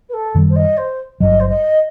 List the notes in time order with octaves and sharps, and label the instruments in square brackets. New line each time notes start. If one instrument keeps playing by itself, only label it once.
[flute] B4
A4
[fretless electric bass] F#2 D#3 G3
[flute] C5
D#5
C5
[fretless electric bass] G1 G2 F#3 [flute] D#5
[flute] C5
D#5